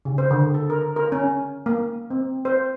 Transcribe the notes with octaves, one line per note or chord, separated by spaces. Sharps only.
C#3
C5
D3
A4
A#4
A#4
C#4
A#3
C4
C5